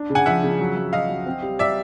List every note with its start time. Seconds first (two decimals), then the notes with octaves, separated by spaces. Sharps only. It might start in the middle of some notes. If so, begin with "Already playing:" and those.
Already playing: D4
0.10 C#3
0.15 F#5 G#5
0.26 F3 E5 F#5
0.43 C#3
0.59 F#3
0.76 F#3
0.93 F#3 D#5 F5
1.09 F#3
1.26 C4
1.42 G3
1.59 G3 D5 E5